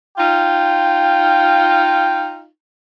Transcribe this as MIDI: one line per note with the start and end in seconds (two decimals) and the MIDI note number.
0.18 2.46 63
0.18 2.46 65
0.18 2.39 79